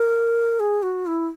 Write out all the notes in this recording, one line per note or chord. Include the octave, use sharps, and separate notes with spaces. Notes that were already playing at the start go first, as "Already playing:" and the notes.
Already playing: A#4
G#4
F#4
E4